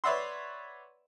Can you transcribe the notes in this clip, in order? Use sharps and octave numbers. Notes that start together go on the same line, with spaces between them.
B4 C#5 D5 E5 F#5 C6